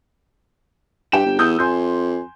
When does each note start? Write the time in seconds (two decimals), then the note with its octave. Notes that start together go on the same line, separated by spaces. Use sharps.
1.12 G2 G4 G5 E7
1.26 G1
1.39 E2 D#6 E6 G6
1.59 F2 G#5 C6 G6